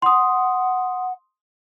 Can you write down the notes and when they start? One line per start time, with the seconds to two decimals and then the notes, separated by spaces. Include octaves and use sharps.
0.02 F#5 C6 D#6